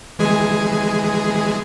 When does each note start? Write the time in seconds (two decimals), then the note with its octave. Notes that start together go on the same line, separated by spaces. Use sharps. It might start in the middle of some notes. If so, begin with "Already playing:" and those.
0.19 E3 G#3 G#4